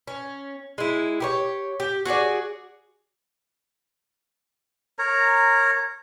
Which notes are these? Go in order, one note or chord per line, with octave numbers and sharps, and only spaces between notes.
C#4
G#3 E4
G4 A#4 C#5
G4
F#4 G#4 C#5 D5
A#4 C#5 A#5